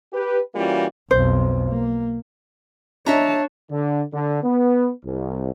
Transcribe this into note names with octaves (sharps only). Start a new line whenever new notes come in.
G4 B4
E3 G3 A#3 C#4 F4 F#4
B1 F2 C5
A#3
D4 C#5 D#5 E5 A5 A#5
D3
D3
B3
C2